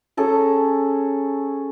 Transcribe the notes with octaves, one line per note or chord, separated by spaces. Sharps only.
C#4 G#4 A4 A#5